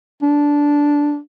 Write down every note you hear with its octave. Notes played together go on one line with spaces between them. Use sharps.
D4